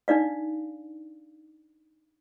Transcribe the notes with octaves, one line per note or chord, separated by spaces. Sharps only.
D4 D#4 D5 F5